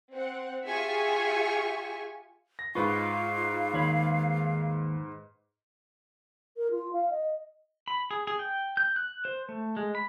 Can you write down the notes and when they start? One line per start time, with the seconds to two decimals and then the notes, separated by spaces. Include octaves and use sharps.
0.12 C4 F#5
0.67 F4 G4 G#4 E5 G#5 C#6
2.59 A#6
2.75 G#2 F4 B4 F5 C#6
3.74 D#2 C#5 B5
6.57 A#4
6.71 F4
6.93 F5
7.10 D#5
7.88 B5
8.11 G#4
8.27 G#4
8.39 G5
8.77 G6
8.96 F#6
9.25 C5
9.49 A3
9.77 G#3
9.95 B5